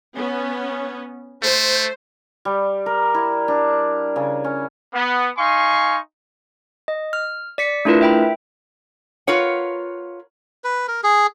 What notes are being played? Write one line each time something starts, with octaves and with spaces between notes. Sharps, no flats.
B3 C#4
A3 C5
G3
A#4
E4
D4
C#3
C#4
B3
D#4 F5 G#5 C6 C#6
D#5
F6
D5 B6 C#7
A3 D4 E4 F4 A#4 B4
E5 G5 B5
F4 A#4 B4 C#5 F#5
B4
A#4
G#4